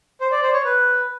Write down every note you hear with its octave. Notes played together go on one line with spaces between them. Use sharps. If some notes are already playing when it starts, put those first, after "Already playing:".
C5
D5
C5
C#5
B4